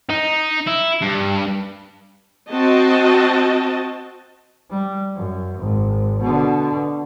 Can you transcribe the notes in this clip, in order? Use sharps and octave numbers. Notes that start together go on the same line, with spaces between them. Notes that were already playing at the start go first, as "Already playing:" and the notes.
D#4
E4
G2
C4 F#4 D#5 A5
G3
F#2
G#1
B2 D3